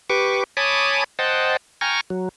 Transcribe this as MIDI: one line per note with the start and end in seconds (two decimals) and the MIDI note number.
0.10 0.44 67
0.10 0.44 71
0.10 0.44 85
0.10 0.44 86
0.57 1.04 73
0.57 1.04 80
0.57 1.04 81
0.57 1.04 83
0.57 1.04 86
0.57 1.04 87
1.19 1.57 72
1.19 1.57 75
1.19 1.57 78
1.19 1.57 79
1.19 1.57 81
1.81 2.01 79
1.81 2.01 80
1.81 2.01 82
1.81 2.01 85
1.81 2.01 89
2.10 2.29 54